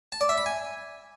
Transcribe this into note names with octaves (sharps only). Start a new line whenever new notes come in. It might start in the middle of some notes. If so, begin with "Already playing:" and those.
A5
D5
E5
B5
G#5